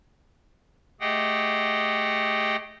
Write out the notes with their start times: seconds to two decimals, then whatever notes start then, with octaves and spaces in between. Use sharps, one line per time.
1.01 A3 G4 G#4 D#5 F#5 G5